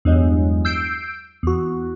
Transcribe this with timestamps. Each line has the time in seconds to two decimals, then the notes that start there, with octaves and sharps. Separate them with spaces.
0.05 E2 G2 F#3 G#3
0.65 E6 G6 C7 D7
1.43 E2 F#4